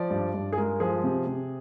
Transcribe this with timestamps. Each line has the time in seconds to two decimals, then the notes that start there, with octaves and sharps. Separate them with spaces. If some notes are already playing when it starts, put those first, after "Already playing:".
Already playing: F3 D5
0.10 G2
0.34 G2
0.53 G#4
0.58 G#3 A#4
0.80 F3 G#4
1.04 C3
1.27 C3